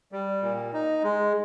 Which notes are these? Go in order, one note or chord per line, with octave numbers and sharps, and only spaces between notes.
G3
A#2
D#4
G#3